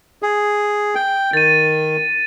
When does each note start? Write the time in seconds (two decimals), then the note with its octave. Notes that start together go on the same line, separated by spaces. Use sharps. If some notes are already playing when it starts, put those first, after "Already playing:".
0.23 G#4
0.95 G5
1.33 D#3 A6 D#7